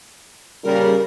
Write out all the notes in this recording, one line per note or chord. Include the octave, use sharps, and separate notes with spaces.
A#2 C#3 G3 A#4